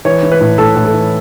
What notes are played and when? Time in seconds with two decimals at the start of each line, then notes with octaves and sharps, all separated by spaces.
0.05 E3 C#5
0.23 E3
0.32 B4
0.41 A2
0.58 A2 A4
0.76 A2
0.85 A4
0.94 E3